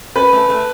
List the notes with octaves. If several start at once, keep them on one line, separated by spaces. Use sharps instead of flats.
C#4 B4
A3
A3